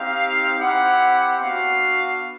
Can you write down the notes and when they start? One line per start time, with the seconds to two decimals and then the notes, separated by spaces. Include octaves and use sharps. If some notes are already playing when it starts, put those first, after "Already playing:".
Already playing: C4 D#4 G4 F5
0.60 C4 E4 G4 F#5
1.43 B3 D4 F#4 F5